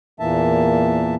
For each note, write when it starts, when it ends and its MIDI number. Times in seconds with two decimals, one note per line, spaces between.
0.20 1.15 40
0.20 1.15 46
0.20 1.15 52
0.20 1.15 58
0.20 1.15 76
0.20 1.15 81